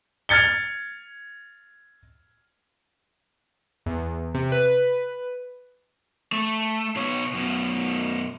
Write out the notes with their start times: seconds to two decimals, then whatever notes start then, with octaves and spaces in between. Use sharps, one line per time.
0.29 F6 G#6 A6 C#7 G7
3.86 E2
4.35 C3
4.52 B4
6.32 A3
6.96 B2 C#5
7.33 F#2 B2